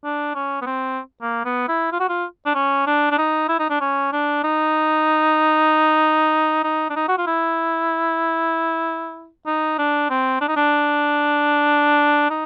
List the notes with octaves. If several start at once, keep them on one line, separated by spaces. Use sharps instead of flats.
D4
C#4
B3
C4
A#3
B3
E4
F4
F#4
F4
D4
C#4
D4
D4
D#4
E4
D#4
D4
C#4
D4
D#4
D#4
D4
D#4
F#4
F4
E4
D#4
D4
C4
D4
D#4
D4
D#4